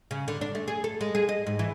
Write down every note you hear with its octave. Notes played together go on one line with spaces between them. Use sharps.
C#3
D3
D4
A3
G#4
A4
G#3
G#4
D#5
G#2
E3